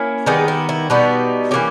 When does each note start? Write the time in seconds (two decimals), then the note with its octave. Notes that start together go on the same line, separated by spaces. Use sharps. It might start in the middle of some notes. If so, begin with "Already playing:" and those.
Already playing: A#3 C#4 E4
0.26 D#3 G3 B3 D#4 G#4
0.48 E4
0.69 E4
0.90 B2 G3 B3 D#4
1.51 E3 A#3 C#4 G4